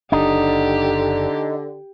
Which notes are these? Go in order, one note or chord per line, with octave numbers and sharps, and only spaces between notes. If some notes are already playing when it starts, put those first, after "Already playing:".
F#1 D3 D4 D#4 G4